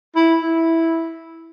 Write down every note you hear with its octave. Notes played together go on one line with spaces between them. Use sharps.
E4
E4